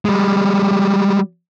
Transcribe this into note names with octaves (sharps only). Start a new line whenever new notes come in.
G3 G#3